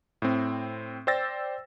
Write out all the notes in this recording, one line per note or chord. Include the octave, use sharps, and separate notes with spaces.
A2 C4
C5 D5 G5 E6 A6 A#6